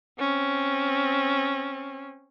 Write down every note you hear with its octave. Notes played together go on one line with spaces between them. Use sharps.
C4 C#4